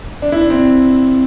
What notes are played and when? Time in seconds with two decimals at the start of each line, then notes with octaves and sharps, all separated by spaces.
0.22 D4
0.32 E4
0.41 D4
0.50 C4